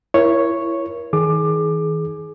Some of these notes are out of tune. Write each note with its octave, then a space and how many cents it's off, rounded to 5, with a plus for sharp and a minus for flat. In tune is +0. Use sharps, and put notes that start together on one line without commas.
E4 +25 A#4 +30 C#5 +0
D#3 +40 G#4 +25 D6 +20